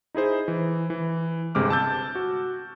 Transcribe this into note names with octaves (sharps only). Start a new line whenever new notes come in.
D#4 E4 G#4 C5
E3
E3
G1 C3 G#3 D6 F6
A5 E6 G6 A6
F#4